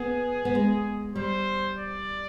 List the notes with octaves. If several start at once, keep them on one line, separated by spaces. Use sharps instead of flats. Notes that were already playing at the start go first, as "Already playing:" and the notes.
Already playing: B3 G#4
B3
G#3
G3 C5
D5